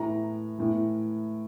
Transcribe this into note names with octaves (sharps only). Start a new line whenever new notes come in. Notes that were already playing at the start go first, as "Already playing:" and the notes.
Already playing: A2 E3 A#5
A2 E3